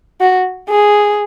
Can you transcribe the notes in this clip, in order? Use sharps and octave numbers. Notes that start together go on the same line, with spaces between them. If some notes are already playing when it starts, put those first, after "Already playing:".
F#4
G#4